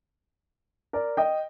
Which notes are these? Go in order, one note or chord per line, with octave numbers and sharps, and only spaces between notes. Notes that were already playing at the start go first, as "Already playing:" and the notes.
A#4 D5
D#5 G5